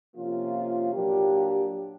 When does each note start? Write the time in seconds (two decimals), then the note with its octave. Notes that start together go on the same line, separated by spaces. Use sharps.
0.14 C3 F3 A#3 C#4 F4
0.93 A#2 F#3 A#3 D4 G4